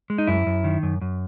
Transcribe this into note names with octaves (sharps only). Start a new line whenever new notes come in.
G#3
D#4
F#2 E4
F#2
D#3
F#2
F#2